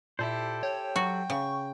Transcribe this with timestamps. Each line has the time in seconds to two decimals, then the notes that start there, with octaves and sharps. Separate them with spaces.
0.19 A#2 E4 G4 A4 C5
0.63 C#5 G5
0.96 F#3 F#4
1.30 C#3 C#6